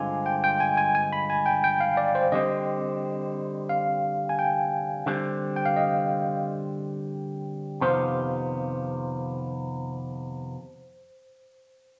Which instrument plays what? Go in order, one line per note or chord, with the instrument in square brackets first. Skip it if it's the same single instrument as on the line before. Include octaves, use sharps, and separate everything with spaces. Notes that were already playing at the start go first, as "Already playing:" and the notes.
Already playing: [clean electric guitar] G2 D3 G#3 C4 F4 [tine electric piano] G#5
[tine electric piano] G5
G5
G#5
G#5
G#5
B5
G#5
G5
G5
F5
D5
C5
[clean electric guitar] D3 G3 C4 [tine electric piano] D#5
[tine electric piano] F5
G#5
G5
[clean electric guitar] D3 G3 C4
[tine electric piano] G5
F5
D#5
[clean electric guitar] F2 C3 D#3 B3 F4 [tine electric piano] C5